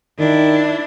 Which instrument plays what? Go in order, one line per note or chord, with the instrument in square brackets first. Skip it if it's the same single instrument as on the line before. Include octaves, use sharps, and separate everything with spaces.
[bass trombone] D#3 [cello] D4 E4